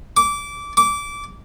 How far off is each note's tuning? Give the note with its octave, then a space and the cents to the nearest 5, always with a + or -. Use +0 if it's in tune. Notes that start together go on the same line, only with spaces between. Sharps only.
D6 -20
D6 -20